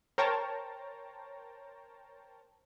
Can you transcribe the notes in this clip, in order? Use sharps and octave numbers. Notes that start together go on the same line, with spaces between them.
A#4 C5 C#5 G5 A5 A#5